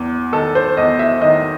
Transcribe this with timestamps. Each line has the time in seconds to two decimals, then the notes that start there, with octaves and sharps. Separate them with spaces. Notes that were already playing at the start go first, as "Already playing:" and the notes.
Already playing: E2
0.32 D#3 A4
0.55 C5
0.77 E2 D#5
0.99 E5
1.21 D#3 D#5